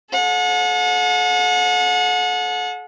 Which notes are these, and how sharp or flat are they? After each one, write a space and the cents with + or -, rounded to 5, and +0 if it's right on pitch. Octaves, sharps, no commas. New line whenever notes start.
A4 -45 F#5 -35